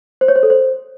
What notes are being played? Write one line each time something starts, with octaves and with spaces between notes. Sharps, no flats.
C5
C#5
C5
A4
C5